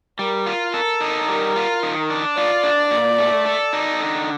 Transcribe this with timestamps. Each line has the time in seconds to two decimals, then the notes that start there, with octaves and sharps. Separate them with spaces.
0.19 G3 A#4
0.46 F4
0.74 A4 A#4
1.01 D#4
1.28 G3 A#4
1.56 F4
1.83 D#3
2.10 D4
2.37 F4 D5
2.64 D4
2.91 A#2
3.18 A3
3.46 A4
3.73 D#4
4.00 D3